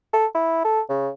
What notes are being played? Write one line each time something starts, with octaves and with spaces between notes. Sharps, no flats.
A4
E4
A4
C#3